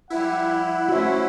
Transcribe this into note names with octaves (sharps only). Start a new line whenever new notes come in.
F3 G3 E4 F#5
A3 C#4 F#4 C5 E5